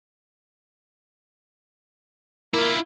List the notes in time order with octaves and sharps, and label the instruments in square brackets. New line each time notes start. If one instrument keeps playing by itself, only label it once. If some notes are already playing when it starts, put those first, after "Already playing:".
[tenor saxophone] A#3 [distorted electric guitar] E4 F4